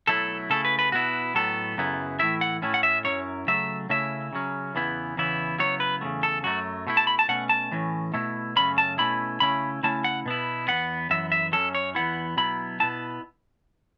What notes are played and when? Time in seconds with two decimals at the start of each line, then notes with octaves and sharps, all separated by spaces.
0.07 B2 F#3 A3 E4 A4
0.50 C#3 A3 E4 A4
0.65 B4
0.79 B4
0.92 B2 B3 E4 F#4
1.35 A2 F#3 B3 A4
1.77 F#2 C#3 F#3 B3 E4
2.19 A2 E3 A3 E4 E5
2.41 F#5
2.62 A2 A3 C#4 E4
2.74 F#5
2.83 E5
3.04 F#2 F#3 C#4 E4 C#5
3.47 C#3 F#3 A3 E5
3.89 C#3 A3 C#4 E4 E5
4.33 C#3 F#3 C#4
4.75 E2 C#3 E3 B3 E4
5.16 E2 C#3 E3 B3 E4
5.58 C#3 F#3 B3 E4 C#5
5.80 B4
6.01 E2 C#3 F#3 A3
6.23 A4
6.43 F#2 F#3 A3 F#4
6.87 B2 A3 E4
6.97 A5
7.07 B5
7.19 A5
7.28 B2 A3 C#4 F#5
7.49 A5
7.72 A2 E3 C#4
8.14 B2 A3 E4
8.56 F#2 C#3 A3 C#4 B5
8.78 A5
8.98 B2 A3 C#4 E4 B5
9.40 C#3 A3 C#4 E4 B5
9.83 C#3 A3 C#4 E4 A5
10.04 F#5
10.26 B2 B3 E4
10.68 E2 E3 B3 F#5
11.10 F#2 E3 B3 E5
11.32 E5
11.52 F#2 F#3 C#4 A4
11.75 C#5
11.95 E2 B2 B3 E4 F#5
12.37 B2 F#3 B3 E4 B5
12.80 B2 B3 E4 A5